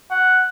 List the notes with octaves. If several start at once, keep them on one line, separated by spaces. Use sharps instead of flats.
F#5